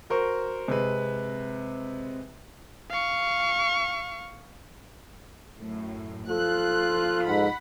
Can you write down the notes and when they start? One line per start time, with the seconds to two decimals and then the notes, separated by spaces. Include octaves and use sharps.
0.10 F#4 A#4 C5 C#6
0.68 C3 G#3 B4
2.91 F5 C#6
5.58 F#2 A2
6.29 F3 F4 A4 F#6
7.25 G#2 F#5 B5